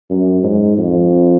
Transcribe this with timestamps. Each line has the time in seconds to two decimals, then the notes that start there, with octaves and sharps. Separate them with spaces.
0.10 F#2
0.43 G#2
0.78 F2